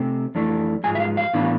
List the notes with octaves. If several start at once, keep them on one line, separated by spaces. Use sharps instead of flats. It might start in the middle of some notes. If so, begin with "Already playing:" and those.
Already playing: C3 A3 C4
F2 E3 A3 D4
G#2 F3 G#3 G#5
E5
F5
F5
A2 E3 B3 D4